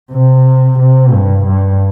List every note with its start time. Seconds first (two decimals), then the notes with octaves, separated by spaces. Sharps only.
0.12 C3
0.78 C3
1.12 G2
1.46 G2